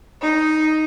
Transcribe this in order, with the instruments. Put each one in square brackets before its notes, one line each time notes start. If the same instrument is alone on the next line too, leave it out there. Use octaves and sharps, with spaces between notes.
[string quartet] D#4